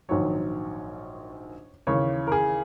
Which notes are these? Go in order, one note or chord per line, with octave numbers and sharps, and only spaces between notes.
A#1 G#2 D#3 F#3 C#5
D#2 C#3 E3 C#5
A#4
G#4